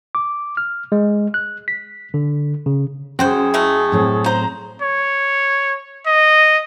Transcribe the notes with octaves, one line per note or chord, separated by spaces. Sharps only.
D6
F6
G#3
F#6
B6
D3
C#3
F#2 C4 F#4 G#4 C5 G5
G#3 A3 E4
A2 F#3 C4
C5 A#5
C#5
D#5